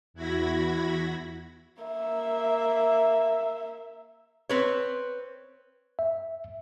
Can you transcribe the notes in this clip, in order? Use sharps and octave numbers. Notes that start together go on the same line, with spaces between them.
E2 E4 F#4 B5 G#6 A#6
A#3 E5
C4 B4 C#5
E5